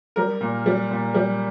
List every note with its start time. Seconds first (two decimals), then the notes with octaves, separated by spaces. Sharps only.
0.16 G3 A#4
0.41 A#2
0.66 G3
0.91 A#2
1.14 G3